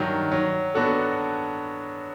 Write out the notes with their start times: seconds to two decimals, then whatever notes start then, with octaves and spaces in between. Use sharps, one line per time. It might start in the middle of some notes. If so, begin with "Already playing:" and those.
Already playing: G2 D#3 F#3
0.32 F#3
0.74 B3 D4 F#4 A4